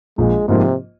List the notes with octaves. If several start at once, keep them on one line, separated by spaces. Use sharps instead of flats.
A#1 G#3
G#2 C3 F3 A#3 F4